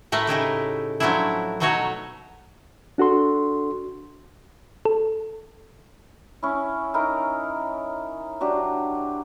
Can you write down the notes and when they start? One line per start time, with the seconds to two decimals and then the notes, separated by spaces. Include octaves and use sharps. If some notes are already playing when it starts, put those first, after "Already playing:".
0.12 A2 A3 A#4 B4 A5
0.27 C#3 D#4 E4 G4
1.00 F3 F#3 A3 C#4 D4 E4
1.60 B2 F#3 A3 D#4 F#4 C#5
2.98 D4 F#4 A4 C6
4.85 A4
6.43 C#4 E4
6.94 D#4 E4 A#4
8.41 F#3 D4 G4